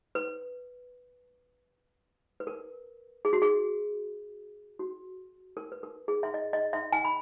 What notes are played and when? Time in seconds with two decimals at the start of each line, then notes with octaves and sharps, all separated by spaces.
0.15 B4
2.40 B4
2.47 A#4
3.25 G#4
3.33 F#4
3.42 G#4
4.79 F#4
5.57 A#4
5.72 B4
5.83 A#4
6.08 G#4
6.23 E5
6.34 D#5
6.53 D#5
6.73 E5
6.92 G#5
7.05 B5